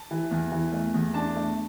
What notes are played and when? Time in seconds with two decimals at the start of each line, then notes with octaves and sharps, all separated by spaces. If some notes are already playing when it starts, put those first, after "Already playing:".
Already playing: A5
0.11 E3
0.31 E2
0.52 E3
0.72 A3
0.94 E2
1.14 D4 A5
1.35 A3